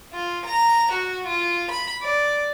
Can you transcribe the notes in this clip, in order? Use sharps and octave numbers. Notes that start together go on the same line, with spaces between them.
F4
A#5
F#4
F4
B5
D5